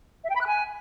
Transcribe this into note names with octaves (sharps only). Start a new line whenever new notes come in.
E5
G5
B5
F#6
G#5